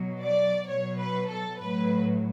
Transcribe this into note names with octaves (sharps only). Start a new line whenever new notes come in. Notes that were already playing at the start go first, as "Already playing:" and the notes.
Already playing: B2 F#3
D5
B2 F#3 C#5
B4
A4
A2 F#3 B4